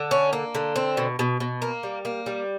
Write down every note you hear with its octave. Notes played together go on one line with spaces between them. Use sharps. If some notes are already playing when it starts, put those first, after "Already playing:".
Already playing: D3
C#4
A#3
D3
C4
B2
B2
B2
A#3
G3
A#3
G3